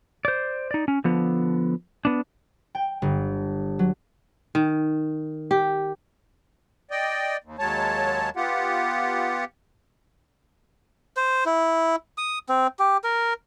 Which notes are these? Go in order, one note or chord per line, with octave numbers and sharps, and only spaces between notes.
C5 D5
D#4 D5
C#4
D3 F3 B3
B3 D4
G5
G1
F#3
D#3
G4
D5 D#5 G5
D#2
D#2 F#3 G#3 C#5 A5
B3 F4 G4 F#5
C5
E4
D#6
C4
G4
A#4